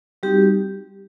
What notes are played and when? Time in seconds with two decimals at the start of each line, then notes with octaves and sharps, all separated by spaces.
0.23 G3 C4 D#4 F#4 G4